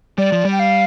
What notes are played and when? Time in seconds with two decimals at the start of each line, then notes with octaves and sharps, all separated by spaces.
0.18 G3 D5
0.32 F3
0.45 G3
0.52 G5
0.59 F5